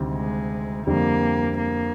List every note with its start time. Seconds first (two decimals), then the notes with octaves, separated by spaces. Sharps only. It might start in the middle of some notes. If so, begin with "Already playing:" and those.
Already playing: D2 C3 D#3 G3 C4
0.13 G#3
0.87 F2 D3 G3 A#3
1.59 A#3